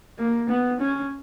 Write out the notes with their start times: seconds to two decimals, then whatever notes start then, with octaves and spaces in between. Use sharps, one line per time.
0.19 A#3
0.49 B3
0.80 C#4